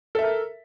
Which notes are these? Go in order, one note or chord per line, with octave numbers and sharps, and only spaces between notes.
A4 A#4 E5